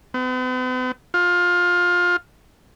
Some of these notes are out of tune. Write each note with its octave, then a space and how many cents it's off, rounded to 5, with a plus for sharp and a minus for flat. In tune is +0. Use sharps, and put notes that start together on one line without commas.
B3 +45
F4 +20